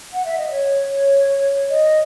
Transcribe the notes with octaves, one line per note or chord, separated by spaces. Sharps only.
F#5
E5
D#5
C#5
D#5